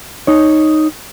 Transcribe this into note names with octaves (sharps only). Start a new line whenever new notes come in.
D#4 C#5